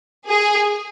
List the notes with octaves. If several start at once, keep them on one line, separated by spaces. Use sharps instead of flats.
G#4